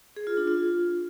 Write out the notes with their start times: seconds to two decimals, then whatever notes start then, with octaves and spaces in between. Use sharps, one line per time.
0.17 G#4
0.27 F4
0.37 D4
0.48 F4